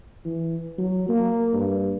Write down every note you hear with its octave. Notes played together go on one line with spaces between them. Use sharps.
E3
F#3
A#3
G2